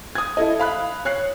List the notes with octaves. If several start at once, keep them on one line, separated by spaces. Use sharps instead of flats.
D#6 G#6
E4 A4 D#5
F5 B5 F#6
C#5 F#6 C7